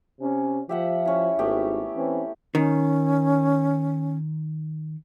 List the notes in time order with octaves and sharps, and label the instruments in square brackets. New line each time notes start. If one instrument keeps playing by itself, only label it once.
[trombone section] C3 C#4
[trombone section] F3 [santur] G4 E5 F#5
[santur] C#4 E4
[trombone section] G#1 [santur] A3 B3 G4
[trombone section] E3 C4 C#4
[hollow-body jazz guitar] D#3 [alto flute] C#4